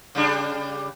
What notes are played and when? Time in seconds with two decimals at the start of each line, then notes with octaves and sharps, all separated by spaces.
0.15 C#3 G3 D4